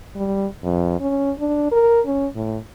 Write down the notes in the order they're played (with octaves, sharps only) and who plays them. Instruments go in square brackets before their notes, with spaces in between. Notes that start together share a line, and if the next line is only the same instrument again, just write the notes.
[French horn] G3
F2
C#4
D4
A#4
C#4
A2